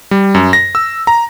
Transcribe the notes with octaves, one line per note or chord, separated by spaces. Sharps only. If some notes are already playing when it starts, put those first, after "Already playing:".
G3
F#2
A#6
E6
A#5